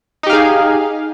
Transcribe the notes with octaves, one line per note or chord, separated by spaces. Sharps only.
D#4 G4 G#4 F5